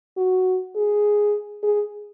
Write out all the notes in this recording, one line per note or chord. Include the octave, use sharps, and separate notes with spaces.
F#4
G#4
G#4